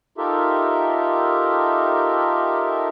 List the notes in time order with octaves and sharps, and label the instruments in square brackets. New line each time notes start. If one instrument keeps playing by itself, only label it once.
[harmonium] D#4 F4 G4 A4 A#4 E5